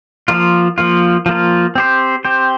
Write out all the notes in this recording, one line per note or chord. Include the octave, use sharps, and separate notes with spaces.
F3 A#3 F4
F3 A#3 F4
F3 A#3 F4
C4 G4 C5
C4 G4 C5